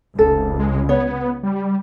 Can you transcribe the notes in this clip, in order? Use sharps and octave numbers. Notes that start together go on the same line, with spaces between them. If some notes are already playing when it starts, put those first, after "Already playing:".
F1 C#2 A4
G#3
B3 C#5
G3